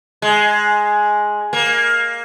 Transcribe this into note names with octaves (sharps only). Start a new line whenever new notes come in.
G#3
A#3